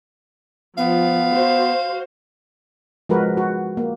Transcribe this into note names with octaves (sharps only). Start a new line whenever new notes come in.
F3 B3 F5
F#4 C5
F3 G#3 F#4 A#4 B4
F#4
A#3